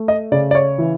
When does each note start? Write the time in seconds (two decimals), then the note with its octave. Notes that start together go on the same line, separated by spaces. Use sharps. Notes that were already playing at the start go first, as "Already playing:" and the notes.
Already playing: A3
0.08 D#5
0.32 C#3 D5
0.51 D5
0.55 C#5
0.78 E3